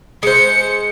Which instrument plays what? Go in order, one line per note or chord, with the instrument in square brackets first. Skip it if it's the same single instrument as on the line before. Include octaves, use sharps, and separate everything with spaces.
[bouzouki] G#3 C5 [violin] C#7